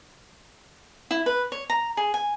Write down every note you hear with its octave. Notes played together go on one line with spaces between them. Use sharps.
E4
B4
C#5
A#5
G#4
G#5